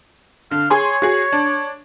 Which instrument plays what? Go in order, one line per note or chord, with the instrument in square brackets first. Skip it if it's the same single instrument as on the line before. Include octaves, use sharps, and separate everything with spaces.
[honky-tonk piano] D3 [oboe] F5
[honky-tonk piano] G#4 G#5 C6 [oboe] C#5
[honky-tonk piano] F#4 G#4
D4